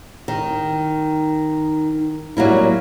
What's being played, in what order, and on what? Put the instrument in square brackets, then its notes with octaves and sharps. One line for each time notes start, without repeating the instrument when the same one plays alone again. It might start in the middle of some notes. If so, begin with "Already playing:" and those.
[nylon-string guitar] D#3
F#3 G3 A#3 E4